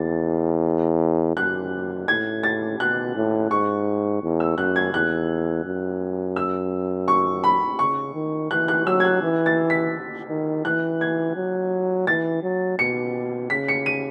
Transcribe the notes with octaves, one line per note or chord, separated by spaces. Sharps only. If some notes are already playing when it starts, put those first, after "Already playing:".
Already playing: E2 A6
F#2 F#6
A2 G#6
A6
B2 F#6
A2
G#2 C#6
E2
E6
F#2 F#6
G#6
E2 F#6
F#2
E6
C#6
B5
C#3 C#6
D#3
E3 F#6
F#6
F#3 E6
G#6
F#6
E3
A6
B6
D#3
E3 F#6
G#6
F#3
E3 A6
F#3
B2 C#7
C#3 B6
C#7
D#7